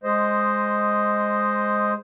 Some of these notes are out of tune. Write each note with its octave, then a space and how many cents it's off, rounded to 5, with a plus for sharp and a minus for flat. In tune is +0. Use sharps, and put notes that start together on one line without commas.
G#3 +0 C5 +0 D#5 -5